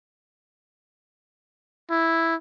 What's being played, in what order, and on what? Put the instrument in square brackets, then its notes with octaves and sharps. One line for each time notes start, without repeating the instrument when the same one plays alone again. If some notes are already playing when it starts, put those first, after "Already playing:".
[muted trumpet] E4